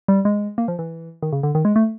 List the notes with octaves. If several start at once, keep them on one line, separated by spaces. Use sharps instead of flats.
G3
G#3
A#3
F3
E3
D#3
C#3
D3
D#3
G#3
A3